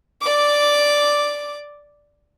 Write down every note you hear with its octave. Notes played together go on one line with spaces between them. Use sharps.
D5 D6